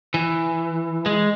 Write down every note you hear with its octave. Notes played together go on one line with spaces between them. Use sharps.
E3
G#3